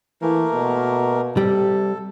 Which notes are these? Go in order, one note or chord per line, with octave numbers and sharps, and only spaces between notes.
E3 A3 A#3 A#4
B2
C3 G3 G4 A4